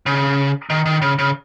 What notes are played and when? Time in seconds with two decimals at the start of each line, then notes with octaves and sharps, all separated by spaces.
0.06 C#3
0.70 D#3
0.86 D#3
1.02 C#3
1.19 C#3